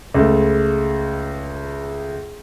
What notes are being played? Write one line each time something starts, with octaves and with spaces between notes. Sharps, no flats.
C#2 A3